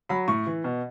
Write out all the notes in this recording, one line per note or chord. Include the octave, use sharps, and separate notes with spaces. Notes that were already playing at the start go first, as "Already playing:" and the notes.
F#3 B5
A2 C#6
E3
B2